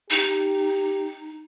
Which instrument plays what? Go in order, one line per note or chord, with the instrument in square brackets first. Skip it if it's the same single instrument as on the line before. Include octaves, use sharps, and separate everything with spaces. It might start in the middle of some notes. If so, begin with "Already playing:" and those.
[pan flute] D#4 [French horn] G4